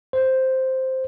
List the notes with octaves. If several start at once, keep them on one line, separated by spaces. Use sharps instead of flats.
C5